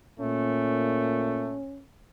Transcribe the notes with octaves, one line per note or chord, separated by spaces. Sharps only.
A#2 A3 C#4